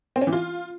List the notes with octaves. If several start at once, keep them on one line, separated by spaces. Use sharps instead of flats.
C4
C#4
E3
F4